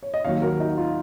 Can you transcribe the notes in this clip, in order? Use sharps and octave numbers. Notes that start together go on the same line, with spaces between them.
C#5
D#5
D#2 D#3 F#3 C#5 F5
F#4 A#4
D#4 F#4
F4